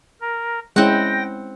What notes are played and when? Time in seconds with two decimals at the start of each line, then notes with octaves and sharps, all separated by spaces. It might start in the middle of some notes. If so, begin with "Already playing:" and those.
0.21 A#4
0.76 G#3 C4 C#4 E4 F#5 G5 A#6